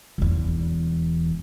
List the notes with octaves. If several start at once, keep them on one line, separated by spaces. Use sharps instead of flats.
E1 E2